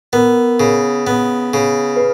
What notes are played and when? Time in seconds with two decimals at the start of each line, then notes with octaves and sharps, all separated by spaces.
0.13 B3 A#4
0.60 C#3
1.07 B3
1.54 C#3
1.96 B4